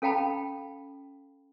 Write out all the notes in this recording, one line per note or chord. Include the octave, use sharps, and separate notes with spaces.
C#4 A4 F5 G5 A5 B5